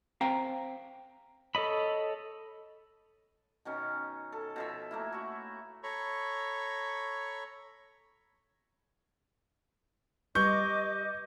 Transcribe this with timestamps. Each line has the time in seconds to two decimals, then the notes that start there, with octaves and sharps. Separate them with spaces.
0.21 C4 F5 G5 A#5
1.55 A4 C#5 D#5 B5
3.65 B2 D#3 C#4
4.32 A4
4.56 B2 F3 E5
4.91 A3 A#3 E4
5.12 F#4 E5
5.83 A4 C#5 A#5 B5 C#6
10.35 G3 G4 B4 D#5 C#6 D6 G6